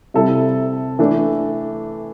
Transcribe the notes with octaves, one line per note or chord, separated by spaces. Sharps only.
C3 G3 E4 A4
E3 A3 D4 A4